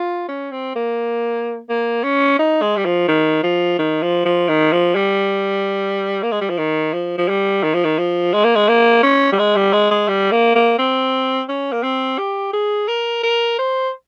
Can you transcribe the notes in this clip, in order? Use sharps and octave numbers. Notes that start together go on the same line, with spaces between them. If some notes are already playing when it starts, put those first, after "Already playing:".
Already playing: F4
C#4
C4
A#3
A#3
C#4
D#4
G#3
G3
F3
D#3
F3
D#3
F3
F3
D#3
F3
G3
A#3
G#3
G3
F3
D#3
F3
F3
G3
D#3
F3
D#3
F3
G#3
A#3
G#3
A#3
C#4
G3
G#3
G3
G#3
G#3
G3
A#3
A#3
C4
C#4
A#3
C4
G4
G#4
A#4
A#4
C5